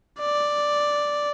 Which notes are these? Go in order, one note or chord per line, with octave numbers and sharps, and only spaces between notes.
D5